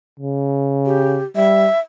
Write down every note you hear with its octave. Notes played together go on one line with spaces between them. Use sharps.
C#3
G4
G3 E5